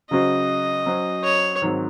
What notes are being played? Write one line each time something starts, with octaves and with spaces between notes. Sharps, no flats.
C#3 F#3 C#4 F#4 C5 D#5
F#3 C#4 F#4 C5
C#5
G#2 D#3 F#3 C4